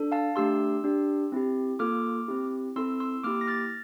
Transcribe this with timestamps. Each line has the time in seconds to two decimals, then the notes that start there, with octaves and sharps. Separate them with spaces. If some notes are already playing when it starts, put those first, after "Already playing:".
Already playing: D4 A4
0.12 F5 A5
0.36 A3 D4 G4 C6 E6
0.84 D4 G4
1.32 C4 E4 G4
1.79 A#3 F4 A4 D6 F6
2.28 C4 E4 G4
2.76 C4 E4 A4 C6 E6
3.00 C6 E6
3.23 A#3 E4 G4 D6 F6
3.41 A#6
3.47 F6 A6